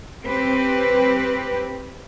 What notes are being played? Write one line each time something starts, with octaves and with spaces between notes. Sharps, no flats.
C4 G4 B4 C5